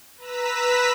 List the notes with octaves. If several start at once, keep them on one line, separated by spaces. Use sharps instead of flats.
B4 A#5 E6 B6